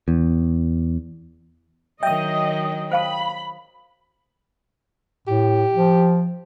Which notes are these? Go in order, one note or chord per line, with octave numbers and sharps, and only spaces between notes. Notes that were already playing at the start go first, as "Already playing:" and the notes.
E2
D#3 F#3 D#5 E5 G5 D#6
C5 F5 A5 B5
A2 G4
F3